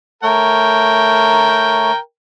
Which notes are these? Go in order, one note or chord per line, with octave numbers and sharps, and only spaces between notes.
A3 A#4 C#5 G5